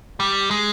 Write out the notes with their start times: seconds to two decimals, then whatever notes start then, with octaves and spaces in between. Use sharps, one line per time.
0.20 G3
0.51 G#3